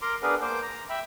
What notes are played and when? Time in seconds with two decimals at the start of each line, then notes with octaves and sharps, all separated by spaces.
0.02 A#4 A#5 C6 D6
0.22 B3 D4 G#4 A#4 B4
0.42 A#3 C5 D6
0.62 A#5
0.90 E5 G5 B5